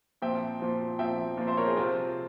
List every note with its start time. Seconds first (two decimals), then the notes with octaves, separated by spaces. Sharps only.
0.22 A#2 F3 C4 E5 G5
0.60 A#2 F3 C4
0.99 A#2 F3 C4 E5 G5
1.37 A#2 F3 C4
1.47 C5 E5
1.57 A#4 C#5
1.66 G#4 C5
1.77 C3 F3 C4 F4